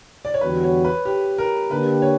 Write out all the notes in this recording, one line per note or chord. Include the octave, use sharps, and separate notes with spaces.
D5
C#5
E2 D3 G3 B3 F#4 B4
C#5
B4
G4
A#4
D3 A#3 D4 G4 B4
C#5